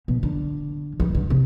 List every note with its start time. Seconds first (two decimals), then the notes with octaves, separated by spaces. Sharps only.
0.08 B2
0.23 D3
1.00 E3
1.15 D3
1.30 C3